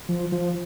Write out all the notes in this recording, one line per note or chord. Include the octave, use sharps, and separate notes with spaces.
F3
F3